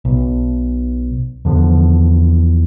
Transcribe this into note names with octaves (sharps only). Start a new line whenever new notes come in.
B1
E2 D3 F3